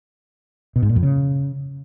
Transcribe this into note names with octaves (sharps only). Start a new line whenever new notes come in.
B2
G#2
A#2
F2
C#3